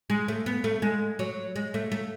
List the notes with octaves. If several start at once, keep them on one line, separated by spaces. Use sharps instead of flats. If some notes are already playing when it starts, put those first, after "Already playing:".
G#3
A3
B3
A3
G#3
F#3
G#3
A3
A3